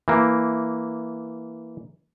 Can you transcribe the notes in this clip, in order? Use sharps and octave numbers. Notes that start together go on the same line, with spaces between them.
E3 A#3